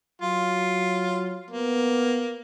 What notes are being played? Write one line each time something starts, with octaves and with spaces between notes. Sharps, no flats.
F#3 F4
A#3 B3